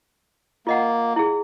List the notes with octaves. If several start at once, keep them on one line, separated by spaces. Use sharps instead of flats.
A#3 F4 D#5 F#5
E4 G#4